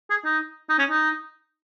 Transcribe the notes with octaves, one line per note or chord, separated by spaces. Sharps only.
G#4
D#4
D#4
C#4
D#4